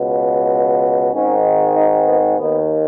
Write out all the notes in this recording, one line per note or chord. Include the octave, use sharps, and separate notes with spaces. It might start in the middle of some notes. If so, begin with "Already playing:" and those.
Already playing: C#2 B2
G#1 G#2 D#3 C#4
D#4
B3
D#2 D#3 B3